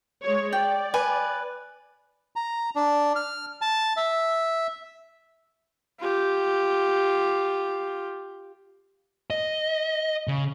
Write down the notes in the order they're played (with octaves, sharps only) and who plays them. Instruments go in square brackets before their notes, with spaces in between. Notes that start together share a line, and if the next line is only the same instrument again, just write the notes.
[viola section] G#3 C#5
[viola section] D5 [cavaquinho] G5
[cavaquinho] B4 G#5
[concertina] A#5
D4
F6
A5
E5
[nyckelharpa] F4 G4
[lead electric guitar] D#5
C#3